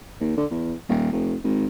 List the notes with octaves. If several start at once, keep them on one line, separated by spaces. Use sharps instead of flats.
D#2
D3
E2
D#1
F1
G#1